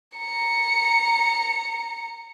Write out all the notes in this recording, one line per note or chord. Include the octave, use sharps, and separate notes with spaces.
A#5 C#7